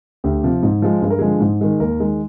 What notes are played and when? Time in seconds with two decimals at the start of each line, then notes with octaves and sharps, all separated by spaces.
0.24 D2 G4
0.43 C3 F3
0.63 G#2
0.82 F3 G#3
1.02 G2 G#4
1.10 A#4
1.19 D3 F3 G#3 G#4
1.40 G#2
1.61 D#3 G#3
1.80 D#2 A#4
2.00 D#3 G#3